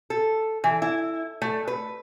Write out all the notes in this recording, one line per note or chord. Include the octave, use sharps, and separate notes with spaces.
A4
E3
E4
A3
B4